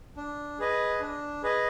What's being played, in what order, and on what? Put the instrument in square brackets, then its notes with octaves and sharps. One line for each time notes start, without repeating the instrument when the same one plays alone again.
[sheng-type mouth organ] D4
G#4 B4 D#5
D4
G#4 B4 D#5